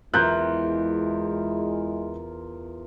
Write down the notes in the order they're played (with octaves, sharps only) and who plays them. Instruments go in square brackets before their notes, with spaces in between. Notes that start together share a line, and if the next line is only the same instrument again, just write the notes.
[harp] E2 [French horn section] G#3 E4 [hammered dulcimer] F4 A#4 [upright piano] F#6 G6